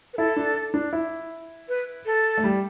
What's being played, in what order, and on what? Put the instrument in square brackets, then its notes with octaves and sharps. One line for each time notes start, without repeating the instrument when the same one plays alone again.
[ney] B4
[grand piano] E4 [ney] A4
[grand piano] D4
D4
E4
[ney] B4
A4
[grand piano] A3
G3